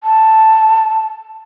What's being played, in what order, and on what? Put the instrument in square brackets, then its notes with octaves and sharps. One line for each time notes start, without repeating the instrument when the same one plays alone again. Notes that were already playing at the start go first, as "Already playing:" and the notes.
[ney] A5